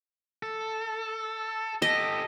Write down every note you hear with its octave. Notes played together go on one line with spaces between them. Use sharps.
A4
G4 A4 D#5